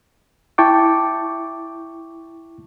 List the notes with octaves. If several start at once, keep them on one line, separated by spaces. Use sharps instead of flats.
E4 G5 A5 C#6 D6